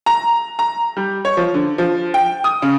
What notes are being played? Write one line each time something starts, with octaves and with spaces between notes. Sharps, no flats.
A#5
A#5
G3
C#5
F3
D3
F3
G5
D#6
C#3